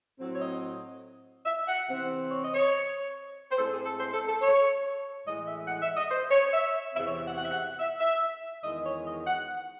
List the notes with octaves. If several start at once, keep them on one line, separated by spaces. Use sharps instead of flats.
A2 F#3 C4
C#5
D#5
E5
F#5
C3 E3 C4
C#5
D#5
C#5
C5
A2 G#3 C4 A4
G#4
A4
C5
A4
A4
C#5
A2 E3 G#3 D#5
E5
F#5
E5
D#5
C5
C#5
E5
E2 C3 E3 C4 E5
C#5
E5
F#5
F#5
E5
F#5
E5
E5
E2 D#3 G#3 D#5
C#5
D#5
F#5